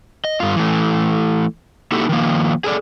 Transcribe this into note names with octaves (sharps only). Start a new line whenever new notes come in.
D#5
G2 F4
E3 A3
A#3 D#4 E4 F#4 G4 A4
D#3 F3 A#3
G#4 A4 C5 D5